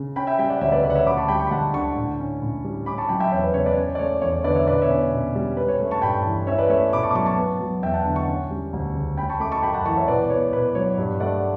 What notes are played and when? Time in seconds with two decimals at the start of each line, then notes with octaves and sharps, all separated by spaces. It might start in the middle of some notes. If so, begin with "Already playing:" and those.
Already playing: C#3
0.16 C#4 G5 B5
0.27 E5 G5
0.38 G3 E5 G5
0.50 D5 F#5
0.61 D2 C#5 E5
0.72 B4 D5
0.84 C#3 B4 D5
0.90 F#5
0.95 C#5 E5
1.07 D2 B5 D6
1.17 A5 C#6
1.28 G3 G5 B5
1.40 A5 C#6
1.47 B5
1.51 D2 F#5 A5
1.74 D3 A5 C#6
1.96 A2
2.20 C#4
2.42 A2
2.64 G3
2.86 C#4 B5 D6
2.98 A5 C#6
3.09 F#3 G5 B5
3.20 E5 G5
3.32 E2 C#5 E5
3.43 B4
3.54 C#3 C#5
3.66 B4 D5
3.77 C#4 C#5
3.95 D5
3.99 A3 C#5
4.22 E2 C#5
4.34 C#5
4.44 D3 B4 D5
4.55 C#5 E5
4.67 B2 B4 D5
4.82 C#5 E5
4.90 C#4
4.98 C#5
5.13 B2
5.35 G3
5.57 C#4 B4
5.68 C#5
5.80 A3
5.91 A5 C#6
6.02 G2 G5 B5
6.25 E3
6.47 C#4 C#5 E5
6.58 B4 D5
6.70 A3 C#5 E5
6.92 B2 B5 D6
7.03 A5 C#6
7.11 D6
7.15 F#3 A5 C#6
7.26 A5 C#6
7.38 B3
7.61 F#3
7.82 E2 E5 G5
7.93 F#5 A5
8.05 D3 F#5 A5
8.16 A5 C#6
8.28 C#4
8.51 G3
8.73 D2
8.95 C#3
9.17 C#4 G5 B5
9.29 A5 C#6
9.40 A3 B5 D6
9.51 A5 C#6
9.62 F#2 G5 B5
9.74 F#5 A5
9.85 E3 A5 C#6
9.97 C#5 E5
10.08 B2 B4 D5
10.30 B3 C#5
10.53 B2 B4
10.75 F#3 C#5
10.98 G2
11.20 A3 D5 F#5